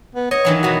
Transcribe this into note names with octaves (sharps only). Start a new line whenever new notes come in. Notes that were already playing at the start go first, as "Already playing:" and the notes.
B3
C#5 D#5
D#3 E3 F#3
B2 F#4 A#5